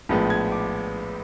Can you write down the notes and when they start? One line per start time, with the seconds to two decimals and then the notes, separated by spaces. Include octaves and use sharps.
0.09 A#1 A2 F3 G#3 B3
0.30 G#6
0.52 D6